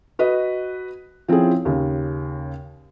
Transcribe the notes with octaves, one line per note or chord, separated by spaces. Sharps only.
F#4 B4 D#5
F3 C4 C#4 E4 G#4
D#2 C#3